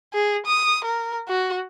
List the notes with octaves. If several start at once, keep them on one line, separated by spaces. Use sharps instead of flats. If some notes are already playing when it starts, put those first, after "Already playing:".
G#4
D#6
A#4
F#4